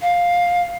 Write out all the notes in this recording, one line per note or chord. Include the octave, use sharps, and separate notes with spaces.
F5